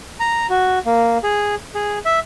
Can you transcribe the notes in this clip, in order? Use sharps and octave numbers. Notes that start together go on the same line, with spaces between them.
A#5
F#4
A#3
G#4
G#4
E5